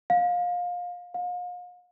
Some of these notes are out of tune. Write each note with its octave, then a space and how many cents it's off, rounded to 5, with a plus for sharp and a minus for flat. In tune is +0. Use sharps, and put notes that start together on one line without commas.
F5 +25
F5 +40